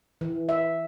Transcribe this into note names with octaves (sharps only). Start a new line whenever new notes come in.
E3
E5